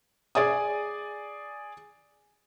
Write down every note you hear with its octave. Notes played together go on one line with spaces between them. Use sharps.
G#4 D5 G#5 D#6